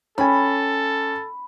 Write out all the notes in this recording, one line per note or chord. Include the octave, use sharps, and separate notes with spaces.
C#4 A4 G5 G#5 B5